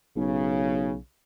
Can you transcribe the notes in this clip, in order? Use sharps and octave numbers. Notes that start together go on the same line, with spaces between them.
B1 C#3